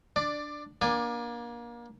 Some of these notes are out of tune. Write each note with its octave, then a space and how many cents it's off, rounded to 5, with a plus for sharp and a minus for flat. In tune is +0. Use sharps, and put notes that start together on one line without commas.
D4 +0 D5 +15
A#3 +30 D4 +0 G#5 -10